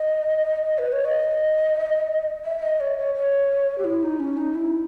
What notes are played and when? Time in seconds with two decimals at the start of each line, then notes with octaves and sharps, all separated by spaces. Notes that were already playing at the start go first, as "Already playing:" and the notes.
Already playing: D#5
0.78 B4
0.92 C#5
1.05 D#5
2.45 E5
2.63 D#5
2.80 C#5
2.97 C#5
3.15 C#5
3.78 G4
3.85 E4
4.03 D#4
4.19 C#4
4.37 D#4
4.55 E4